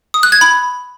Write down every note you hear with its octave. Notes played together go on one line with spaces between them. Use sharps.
D#6
F#6
G#6
B5